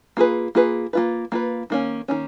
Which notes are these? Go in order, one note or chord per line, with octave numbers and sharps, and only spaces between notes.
A#3 F4 G#4 B4
A#3 F4 G#4 B4
A#3 F4 B4
A#3 F4 B4
D#3 A#3 C#4
D#3 A#3 C#4